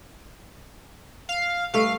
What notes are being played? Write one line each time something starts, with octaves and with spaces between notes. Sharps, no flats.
F5
G2 A3 F5